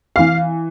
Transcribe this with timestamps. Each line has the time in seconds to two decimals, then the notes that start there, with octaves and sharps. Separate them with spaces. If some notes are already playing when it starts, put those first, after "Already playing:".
0.16 E3 F5